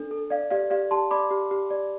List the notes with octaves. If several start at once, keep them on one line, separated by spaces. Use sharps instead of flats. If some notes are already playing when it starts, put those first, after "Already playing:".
Already playing: D4 A4
A4
D5 F5
G4 D5 F5
G4 D5 F5
G4 A5 C6
D5 B5 D6
G4
G4
D5